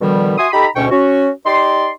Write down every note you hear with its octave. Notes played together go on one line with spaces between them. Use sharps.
B2 D3 D#3 F3 G3
F#4 E5 G#5 C6 D#6
D#4 G4 A4 A#5 B5
D2 G#2 B2 C#4 G5 C#6
C#4 F#4
D#4 G4 D5 C6